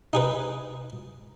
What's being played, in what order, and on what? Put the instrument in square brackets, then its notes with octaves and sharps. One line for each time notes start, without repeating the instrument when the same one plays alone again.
[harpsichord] D#4 G#4 B4